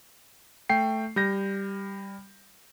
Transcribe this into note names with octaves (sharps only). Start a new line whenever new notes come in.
A3 G5 C7
G3 G6 A#6